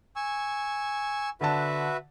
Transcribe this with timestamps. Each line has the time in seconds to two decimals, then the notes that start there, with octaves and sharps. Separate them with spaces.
0.16 G#5 C#6 E6
1.41 D3 F#4 B4 E5 A5